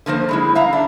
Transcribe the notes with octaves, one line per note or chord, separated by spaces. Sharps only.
D3 F3 A#3 C5
G3 G#3 E4
E5 F5 A#5
D4